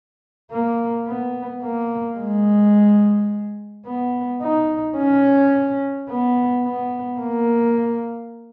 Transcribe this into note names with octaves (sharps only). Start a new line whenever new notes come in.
A#3
B3
A#3
G#3
B3
D#4
C#4
B3
B3
A#3